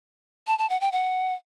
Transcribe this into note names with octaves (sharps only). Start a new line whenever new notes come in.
A5
A5
F#5
G5
F#5